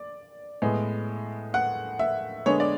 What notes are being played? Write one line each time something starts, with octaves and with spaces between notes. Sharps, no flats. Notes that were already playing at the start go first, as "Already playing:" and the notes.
Already playing: D5
A2 G#3 B3
F#5
E5
D3 G#3 B3 C#5
D5